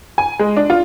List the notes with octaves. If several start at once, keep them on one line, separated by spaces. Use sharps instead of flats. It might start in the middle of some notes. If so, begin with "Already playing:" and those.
G#5
G#3
D4
F4